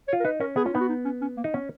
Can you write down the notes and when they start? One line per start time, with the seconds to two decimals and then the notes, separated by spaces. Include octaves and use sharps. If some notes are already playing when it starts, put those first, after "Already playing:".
0.08 C#5
0.13 F4
0.20 A#4
0.25 D#4 B4
0.40 C#4 A#4
0.56 B3 G#4
0.64 C#4 F4
0.73 B3 D#4
0.81 F#4
0.89 D#4
1.05 C#4
1.21 C#4
1.37 A#3
1.44 D#4
1.54 B3 C#4